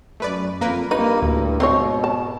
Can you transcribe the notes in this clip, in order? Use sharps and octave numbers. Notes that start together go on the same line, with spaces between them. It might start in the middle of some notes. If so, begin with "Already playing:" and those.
F#2 A3 B4 D5
F2 A#3 A#4 B4
G2 A#3 D#4 B4 D#7
D2 A2
G#2 B2 C4 D#4 C#5 C6
A5